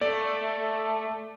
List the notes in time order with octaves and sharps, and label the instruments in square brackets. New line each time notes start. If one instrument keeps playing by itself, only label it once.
[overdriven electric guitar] A3 [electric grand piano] D5